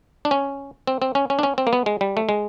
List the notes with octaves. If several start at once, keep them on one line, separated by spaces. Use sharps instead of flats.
D4
C#4
C4
C4
C#4
C#4
D4
C#4
C4
A#3
B3
G#3
G3
A3
G#3